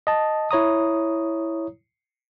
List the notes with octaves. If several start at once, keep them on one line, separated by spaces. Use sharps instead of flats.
D#5 A5
E4 C#5 A#5 D#6